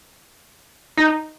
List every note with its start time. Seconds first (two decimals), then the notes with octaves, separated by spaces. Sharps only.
0.97 D#4